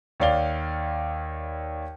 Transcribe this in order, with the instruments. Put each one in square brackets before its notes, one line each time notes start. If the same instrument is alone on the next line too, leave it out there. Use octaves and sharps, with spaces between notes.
[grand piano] D#2 C#5 D5 F5 G7